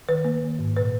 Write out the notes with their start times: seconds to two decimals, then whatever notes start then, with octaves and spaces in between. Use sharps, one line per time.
0.09 D#3 B4
0.25 A#3
0.42 D#3
0.59 G#2
0.77 A#2 B4